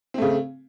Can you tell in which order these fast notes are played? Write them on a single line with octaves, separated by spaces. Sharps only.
C4 A3 C#3